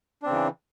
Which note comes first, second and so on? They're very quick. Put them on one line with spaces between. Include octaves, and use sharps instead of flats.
D4 C4 C#3 E3